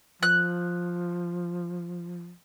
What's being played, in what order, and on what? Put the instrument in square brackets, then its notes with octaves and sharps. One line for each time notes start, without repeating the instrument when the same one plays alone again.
[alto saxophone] F3 [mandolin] F#6